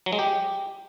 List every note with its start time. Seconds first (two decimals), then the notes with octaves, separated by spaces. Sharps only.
0.06 F#3
0.13 G#3
0.19 G4